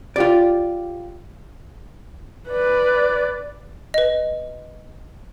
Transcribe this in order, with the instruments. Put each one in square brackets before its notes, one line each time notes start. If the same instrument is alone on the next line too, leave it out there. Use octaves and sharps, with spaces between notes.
[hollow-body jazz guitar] F4 G4 D5
[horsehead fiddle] B4 D5
[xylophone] B4 D#5